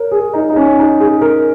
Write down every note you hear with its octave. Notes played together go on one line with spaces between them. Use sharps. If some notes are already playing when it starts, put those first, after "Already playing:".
Already playing: A#4 C#5
G#4
D#4
D#4
C#4
D#4
G#4
A#4